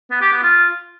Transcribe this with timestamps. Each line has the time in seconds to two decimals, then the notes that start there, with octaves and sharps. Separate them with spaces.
0.11 B3
0.21 G4
0.32 B3
0.43 F4